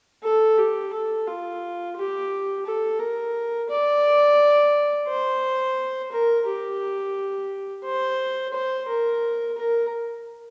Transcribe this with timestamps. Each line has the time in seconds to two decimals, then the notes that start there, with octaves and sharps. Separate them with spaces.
0.24 A4
0.58 G4
0.93 A4
1.27 F4
1.97 G4
2.66 A4
3.00 A#4
3.70 D5
5.08 C5
6.12 A#4
6.47 G4
7.85 C5
8.53 C5
8.89 A#4
9.57 A#4